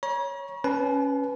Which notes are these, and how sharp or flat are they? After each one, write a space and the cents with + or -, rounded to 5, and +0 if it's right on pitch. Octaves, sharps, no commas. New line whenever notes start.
C#5 +0 A#5 +45
C#4 +0 B4 +0 A5 -35